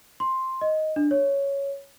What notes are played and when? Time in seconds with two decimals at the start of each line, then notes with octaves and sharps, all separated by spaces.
0.20 C6
0.61 D#5
0.96 D4
1.11 C#5